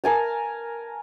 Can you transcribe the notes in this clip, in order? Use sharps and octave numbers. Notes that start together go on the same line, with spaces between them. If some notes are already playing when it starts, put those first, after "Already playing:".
A#4 G#5 A5